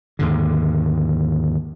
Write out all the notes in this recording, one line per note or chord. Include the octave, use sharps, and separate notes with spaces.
D#2 G#2 D3